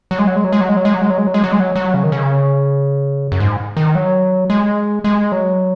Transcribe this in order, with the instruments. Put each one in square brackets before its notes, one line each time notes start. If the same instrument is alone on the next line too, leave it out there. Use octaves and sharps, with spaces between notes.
[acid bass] F#3
G#3
F#3
G#3
F#3
G#3
F#3
G#3
F#3
G#3
F#3
G#3
F#3
G#3
F#3
G#3
F#3
G#3
F#3
F#3
C#3
D#3
C#3
F#2
G#2
D#3
F#3
G#3
G#3
F#3